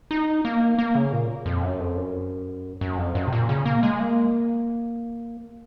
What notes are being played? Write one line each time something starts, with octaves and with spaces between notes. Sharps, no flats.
D#4
A#3
A#3
C#3
A#2
F2
F#2
F2
F#2
F#2
F2
F#2
C3
A#2
C#3
A#3
G#3
A#3